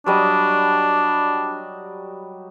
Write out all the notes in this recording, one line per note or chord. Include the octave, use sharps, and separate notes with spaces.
F#3 G3 D4 D#5